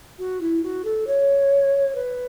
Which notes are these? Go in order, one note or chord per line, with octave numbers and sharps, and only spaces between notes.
F#4
E4
F#4
A4
C#5
B4